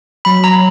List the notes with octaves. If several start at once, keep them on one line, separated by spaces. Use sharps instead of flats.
F#3 B5
A#5